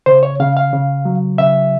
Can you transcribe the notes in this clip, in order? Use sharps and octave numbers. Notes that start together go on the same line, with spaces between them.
C#3 C5
C#5
C#3 F5
F5
C#3
F#3
C#3 E5